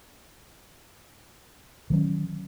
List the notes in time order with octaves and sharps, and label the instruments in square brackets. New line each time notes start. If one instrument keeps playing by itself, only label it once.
[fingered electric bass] D#3 F#3 C#4